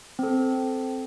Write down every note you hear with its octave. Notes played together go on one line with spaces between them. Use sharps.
C4 A4